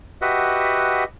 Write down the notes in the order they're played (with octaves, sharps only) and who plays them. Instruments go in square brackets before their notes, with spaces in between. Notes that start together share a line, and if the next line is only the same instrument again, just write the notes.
[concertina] F#4 G4 B4 D#5 E5 F#5